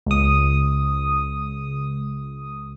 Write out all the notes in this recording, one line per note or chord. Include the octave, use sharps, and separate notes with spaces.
C#2 D#6